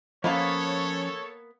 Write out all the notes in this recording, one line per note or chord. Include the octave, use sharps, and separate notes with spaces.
F3 A#3 B3 C#4 A4 C#5 F5 B5